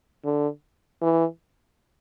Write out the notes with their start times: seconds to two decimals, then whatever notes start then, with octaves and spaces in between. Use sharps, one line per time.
0.25 D3
1.01 E3